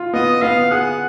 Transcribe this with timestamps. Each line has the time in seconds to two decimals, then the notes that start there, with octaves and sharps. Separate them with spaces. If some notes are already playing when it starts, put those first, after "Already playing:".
Already playing: F4
0.13 B3 D#5
0.42 B3 F5
0.71 G#4 F#5